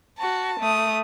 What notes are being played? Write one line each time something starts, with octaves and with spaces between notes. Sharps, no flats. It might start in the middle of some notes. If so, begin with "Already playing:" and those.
F#4 A5
A3 D#6